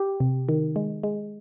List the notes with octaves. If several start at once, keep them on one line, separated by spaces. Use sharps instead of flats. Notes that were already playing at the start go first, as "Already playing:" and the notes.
Already playing: G4
C3
D#3
G#3
G#3